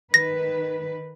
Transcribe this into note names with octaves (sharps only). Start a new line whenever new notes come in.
D#3 B4 A#6